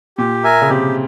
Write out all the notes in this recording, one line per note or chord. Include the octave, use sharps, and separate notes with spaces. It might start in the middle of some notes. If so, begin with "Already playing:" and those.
A#2 G4
A#4 E5 G#5
C#3
C3 G4